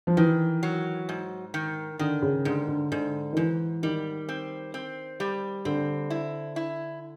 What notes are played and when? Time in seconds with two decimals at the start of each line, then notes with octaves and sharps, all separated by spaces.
0.07 F3
0.17 D#3 E3
0.63 F#3
1.09 G#2
1.54 D#3
1.99 D3 D#3
2.22 C#3
2.45 G#2 D3
2.68 D3
2.92 G#2 D3
3.33 D#3
3.37 G#2 E3
3.83 D#3 G3
4.29 C4
4.74 C4
5.20 G3
5.65 D3 C4
6.10 E4
6.56 E4